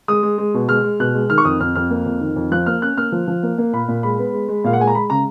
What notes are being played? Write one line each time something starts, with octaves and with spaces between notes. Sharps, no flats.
G#3 D#6
G#3
G#3
B2
G#3 F6
G#3
B2 F#6
G#3
D#3 F6
C#6
F2 D#6
F2 F6
F2 F6
A#3
F2
D#3
F2
F3 F#6
A#3 F6
C#4 F#6
A#3 F6
F3
F3
A#3
A#3
A#2 B5
A#2
G#3 B5
B3
G#3
G#3
A#2 F5
F#5
G#3 G#5
A#5
G#3 B5
C#3 A#5